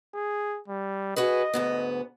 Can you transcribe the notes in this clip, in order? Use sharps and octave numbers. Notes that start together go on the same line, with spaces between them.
G#4
G3
F#4 G#4 B4 D#5
D2 G#2 B3